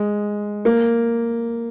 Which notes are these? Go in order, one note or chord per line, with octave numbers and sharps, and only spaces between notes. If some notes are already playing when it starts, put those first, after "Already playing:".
Already playing: G#3
A#3